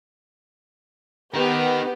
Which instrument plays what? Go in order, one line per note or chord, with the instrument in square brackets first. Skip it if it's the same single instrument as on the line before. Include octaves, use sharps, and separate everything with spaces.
[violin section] B3 G4 [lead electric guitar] D#4 A#4